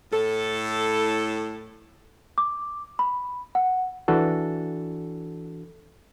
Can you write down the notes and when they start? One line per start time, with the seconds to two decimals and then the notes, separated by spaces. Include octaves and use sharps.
0.12 A2 A4
2.38 D6
2.99 B5
3.55 F#5
4.08 E3 D4 F#4 A4